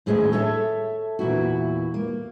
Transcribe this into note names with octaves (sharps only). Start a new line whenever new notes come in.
D#2 A2 C#4 G#4 C5 D#5
A4 C#5 E5 A5
E2 A#2 E4 F#4
A#3